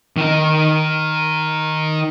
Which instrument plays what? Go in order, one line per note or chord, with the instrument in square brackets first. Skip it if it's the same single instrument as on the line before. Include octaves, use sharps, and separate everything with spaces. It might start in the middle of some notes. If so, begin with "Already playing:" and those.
[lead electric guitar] D#3 D#4